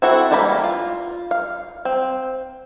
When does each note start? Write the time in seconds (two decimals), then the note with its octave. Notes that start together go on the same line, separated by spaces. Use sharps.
0.02 C4 E4 F#4 A4
0.31 E3 G3 G#3 A#3 B5
0.64 F4
1.31 F5
1.85 C4